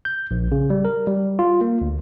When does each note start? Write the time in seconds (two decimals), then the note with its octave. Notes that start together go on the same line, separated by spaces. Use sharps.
0.05 G6
0.31 A#1
0.52 C#3
0.70 G3
0.85 A#4
1.07 G3
1.39 F4
1.61 A#3
1.81 D2